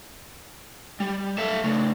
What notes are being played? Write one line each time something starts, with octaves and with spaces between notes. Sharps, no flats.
G3
A4 E5 F5
C#3 A3